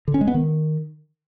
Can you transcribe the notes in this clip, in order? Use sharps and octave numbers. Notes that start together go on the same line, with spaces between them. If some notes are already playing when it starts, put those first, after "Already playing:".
D3
C#4
G#3
B3
D#3